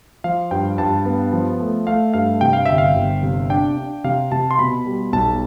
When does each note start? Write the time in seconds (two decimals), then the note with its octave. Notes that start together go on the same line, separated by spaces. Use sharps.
0.24 F3 F5
0.51 G2 G5
0.78 G2 A5
1.05 B3
1.33 F3
1.60 A3
1.87 A3 F5
2.14 G2 F5
2.41 C3 G5
2.53 F5
2.66 G1 E5
2.78 F5
2.95 G1
3.23 C3
3.50 D4 G5
3.77 D4
4.04 C3 F5
4.32 C3 A5
4.51 C6
4.59 B2 B5
4.86 G3
5.13 B1 A5